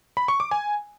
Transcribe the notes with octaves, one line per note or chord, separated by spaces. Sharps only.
B5
C#6
D6
G#5